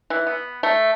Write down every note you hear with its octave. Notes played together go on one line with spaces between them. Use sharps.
E3
B3
A3